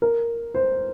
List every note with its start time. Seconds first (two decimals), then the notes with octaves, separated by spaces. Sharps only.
0.02 A#4
0.54 C5